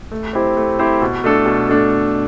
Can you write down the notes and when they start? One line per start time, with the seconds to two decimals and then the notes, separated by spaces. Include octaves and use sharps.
0.11 A3
0.33 C4 E4 G4 C5
0.57 A3
0.79 C4 E4 G4 C5
1.02 B2
1.24 A3 D4 A4
1.46 B2
1.69 A3 D4 A4